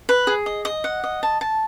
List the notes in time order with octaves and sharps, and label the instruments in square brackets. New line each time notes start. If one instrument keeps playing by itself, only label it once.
[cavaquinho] B4
G#4
D#5
D#5
F#5
D#5
A5
A5